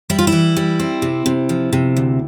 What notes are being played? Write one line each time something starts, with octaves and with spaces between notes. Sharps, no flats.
G3 E4
F4
E4
E3
G3
C4
C3
C3
F3
C3
D2